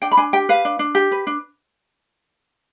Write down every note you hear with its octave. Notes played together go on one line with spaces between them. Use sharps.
D4 G5
B5
D4 G#5
G4 G5
B4 F5
D4
D4
G4
B4
D4